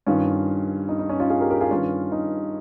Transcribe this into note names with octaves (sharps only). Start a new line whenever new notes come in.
G2 D#3 C#4 F4
D#4
D#4
C#4
C#4 F4
F4 G#4
G4 A#4
G4 A#4
F4 G#4
G2 D#3 C#4 F4
D#4